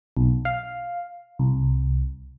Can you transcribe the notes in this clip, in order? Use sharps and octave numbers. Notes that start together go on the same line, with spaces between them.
B1
F5
C2